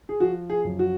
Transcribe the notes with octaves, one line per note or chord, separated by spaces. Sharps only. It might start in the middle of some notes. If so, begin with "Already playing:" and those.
G#4
F3 F#4
G#4
F#2
F#4